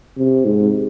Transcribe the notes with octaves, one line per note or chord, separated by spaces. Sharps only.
C3
G#2